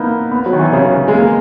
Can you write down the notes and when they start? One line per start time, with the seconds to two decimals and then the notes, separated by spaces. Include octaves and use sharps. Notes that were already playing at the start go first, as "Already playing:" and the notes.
Already playing: A#3 B3 D#4 E4
0.31 B3
0.46 F#3
0.53 D#3
0.59 E3
0.73 C#3
1.08 G#3
1.14 A#3